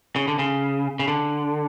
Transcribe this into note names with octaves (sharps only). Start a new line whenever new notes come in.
C#3
D3
C#3
C#3
D3